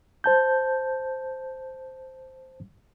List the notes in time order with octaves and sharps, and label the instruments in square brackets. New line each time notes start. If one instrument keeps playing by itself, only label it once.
[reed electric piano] C5 A5 G6